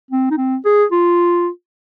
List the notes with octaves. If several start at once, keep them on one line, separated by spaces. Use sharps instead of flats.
C4
D#4
C4
G#4
F4